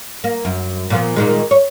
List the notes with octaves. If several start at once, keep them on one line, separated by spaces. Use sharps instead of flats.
A#3
F#2
A#2 F3 B3
A#2 D#3 G#3
C#5